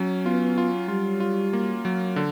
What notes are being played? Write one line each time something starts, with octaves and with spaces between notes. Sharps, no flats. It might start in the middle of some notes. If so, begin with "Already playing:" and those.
Already playing: F#3 C#4
B3 F4
F4
G3 F4
F4
A#3
F#3
D3